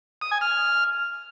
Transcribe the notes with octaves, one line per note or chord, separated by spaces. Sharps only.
D#6
G#5
F6